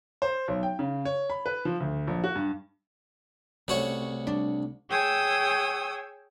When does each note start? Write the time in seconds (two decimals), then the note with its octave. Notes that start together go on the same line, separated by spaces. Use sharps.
0.22 C5
0.48 B1
0.63 G5
0.79 C#3
1.05 C#5
1.30 B5
1.46 B4
1.65 F3
1.80 D2
2.07 A#1
2.24 F#4
2.36 G2
3.68 C2 C3 G3 A3 C4 C#4 F#4 C#5
4.27 G3 D4
4.89 G#4 C#5 G5 D#6 E6